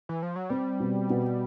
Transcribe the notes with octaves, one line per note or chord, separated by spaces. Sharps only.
E3
F3
F#3
G3 C4
B2
B2